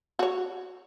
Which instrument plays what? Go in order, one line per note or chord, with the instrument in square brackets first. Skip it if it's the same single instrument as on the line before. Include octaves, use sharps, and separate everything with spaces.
[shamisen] F#4 C#5